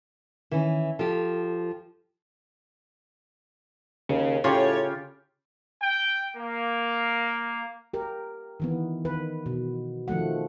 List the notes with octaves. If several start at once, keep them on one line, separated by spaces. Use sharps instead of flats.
D#3 E3 C#4
F3 G4 A4
D#2 C#3
A2 C#3 F4 G4 C#5 G5
G5
A#3
G4 A#4
D#3 E3 B3
D#3 B4
B2
D#3 F3 A3 F#5